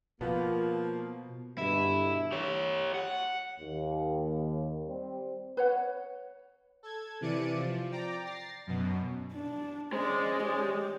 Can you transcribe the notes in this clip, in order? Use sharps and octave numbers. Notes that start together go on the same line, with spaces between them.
B2 F3 A#3 B3
G2 B2 D3 E4
G4 C#5
F#5
D#2
G3 C4
B4 C#5 F#5
A4 G#6
C3 E3 D5 C#7 D#7
F3
D5 G5 A#5 D6
A6 A#6 C7
F#2 B2
D4
G#3 C#4 C5 D5
G4 C#5